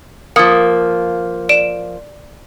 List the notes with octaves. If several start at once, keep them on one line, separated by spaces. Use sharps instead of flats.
F3 A#3 D#6 C#7
D5 D7 E7